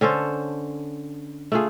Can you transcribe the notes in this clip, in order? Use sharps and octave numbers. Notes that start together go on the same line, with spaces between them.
D3 C#4 A4 C5
A3 F4 G#4